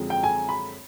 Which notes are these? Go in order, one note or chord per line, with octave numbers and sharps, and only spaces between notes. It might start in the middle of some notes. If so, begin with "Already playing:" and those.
Already playing: F#2 D3 F3 G#3 C4
G5
G#5
B5